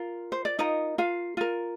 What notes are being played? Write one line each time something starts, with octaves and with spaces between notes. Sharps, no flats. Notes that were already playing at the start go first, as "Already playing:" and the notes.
Already playing: F4 A#4
C5
D5
D#4 F4 A#4 D#5
F4 F5
F4 A#4